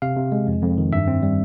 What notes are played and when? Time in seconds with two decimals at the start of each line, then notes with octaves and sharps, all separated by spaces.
0.02 C3 F5
0.17 C3
0.32 G#3
0.47 F2
0.62 F2
0.78 D#3
0.93 G2 E5
1.08 C4
1.23 G3